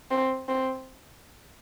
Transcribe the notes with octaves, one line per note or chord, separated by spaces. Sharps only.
C4
C4